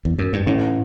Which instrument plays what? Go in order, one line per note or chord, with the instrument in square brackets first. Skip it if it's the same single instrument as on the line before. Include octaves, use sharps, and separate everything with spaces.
[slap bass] E2
F#2
G2
[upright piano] A1 [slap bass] A2